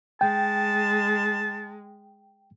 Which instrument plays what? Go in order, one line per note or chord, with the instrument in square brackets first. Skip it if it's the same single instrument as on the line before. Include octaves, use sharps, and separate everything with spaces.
[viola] G#3 [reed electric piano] G5 [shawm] A5